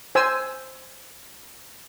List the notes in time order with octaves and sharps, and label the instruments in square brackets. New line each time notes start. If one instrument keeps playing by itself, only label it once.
[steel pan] C5 G#5 E6